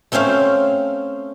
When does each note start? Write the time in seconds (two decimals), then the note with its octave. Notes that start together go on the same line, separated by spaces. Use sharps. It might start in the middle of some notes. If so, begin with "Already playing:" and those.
0.12 A3 C4 C#4 C5 F5